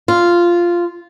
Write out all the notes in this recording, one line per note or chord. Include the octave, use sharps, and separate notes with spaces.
F4